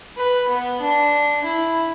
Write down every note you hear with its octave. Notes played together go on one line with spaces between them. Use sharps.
B4
B3
D4
E4